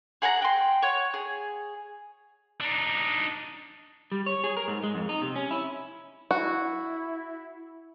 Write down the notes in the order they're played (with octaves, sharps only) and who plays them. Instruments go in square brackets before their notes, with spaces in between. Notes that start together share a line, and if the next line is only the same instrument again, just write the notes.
[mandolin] G#4 F#5 G#5 A#5
G5 C6
C#5 F#5 C#6
G#4
[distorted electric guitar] D4 D#4
[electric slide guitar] G3
C#5
G#4
A#4
G#2
G#3
F2
D#4
C3
C#4
E4
[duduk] E4 [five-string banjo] F#4